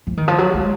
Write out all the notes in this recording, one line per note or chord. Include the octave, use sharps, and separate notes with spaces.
F3
D#3
F3
F#3
G#3